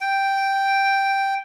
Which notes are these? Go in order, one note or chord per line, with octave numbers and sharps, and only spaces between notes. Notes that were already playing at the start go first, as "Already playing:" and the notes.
G5